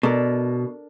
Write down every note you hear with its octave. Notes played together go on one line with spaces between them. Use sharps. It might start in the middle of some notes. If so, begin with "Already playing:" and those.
B2 D4 A4 A#4